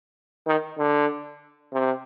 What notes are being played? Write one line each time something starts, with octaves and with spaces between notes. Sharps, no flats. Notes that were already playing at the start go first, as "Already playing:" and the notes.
D#3
D3
C3